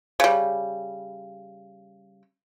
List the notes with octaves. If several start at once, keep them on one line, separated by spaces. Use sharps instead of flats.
C#3 G3